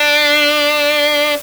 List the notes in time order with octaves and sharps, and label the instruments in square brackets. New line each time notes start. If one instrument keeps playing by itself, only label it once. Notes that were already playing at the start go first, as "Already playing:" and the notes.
Already playing: [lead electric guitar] D4